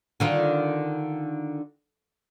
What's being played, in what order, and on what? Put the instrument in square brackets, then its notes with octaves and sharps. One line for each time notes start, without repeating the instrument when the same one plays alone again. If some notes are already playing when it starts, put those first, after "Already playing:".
[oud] D3 D#3 F4